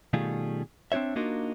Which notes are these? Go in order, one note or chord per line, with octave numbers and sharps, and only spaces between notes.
B2 D#3 G3 A3 F4 G#4
C4 D4 D#4 C#5 E5
A#3 D4 D#4 F4 F#4 A#4